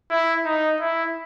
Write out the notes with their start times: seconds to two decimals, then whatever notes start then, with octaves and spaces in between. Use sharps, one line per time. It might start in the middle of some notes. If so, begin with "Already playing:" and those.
0.11 E4
0.45 D#4
0.80 E4